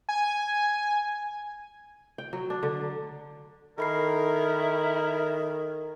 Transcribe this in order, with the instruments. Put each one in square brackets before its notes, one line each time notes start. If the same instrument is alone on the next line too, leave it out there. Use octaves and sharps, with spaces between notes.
[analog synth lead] G#5
[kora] G5
F#3
D4
D3
[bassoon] D#3 [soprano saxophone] E4 [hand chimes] A4 B5 C7 [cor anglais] A#4